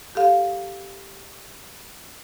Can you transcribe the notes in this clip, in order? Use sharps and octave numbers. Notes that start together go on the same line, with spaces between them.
G4 A4 F5